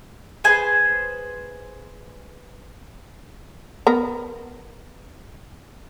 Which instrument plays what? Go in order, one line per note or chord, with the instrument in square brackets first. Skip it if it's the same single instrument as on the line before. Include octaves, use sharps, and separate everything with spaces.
[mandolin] G#4 B4 C5 G#5
[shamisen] B3 A#4 A#5